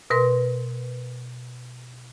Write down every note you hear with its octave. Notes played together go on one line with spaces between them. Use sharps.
B2 A#4 B4 C6